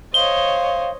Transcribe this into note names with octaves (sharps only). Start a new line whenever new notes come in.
C5 C#5 D#5 F5 G7